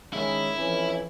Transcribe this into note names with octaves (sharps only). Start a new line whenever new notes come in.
D#3 G#3 C#4 E4
F2 E3 C#4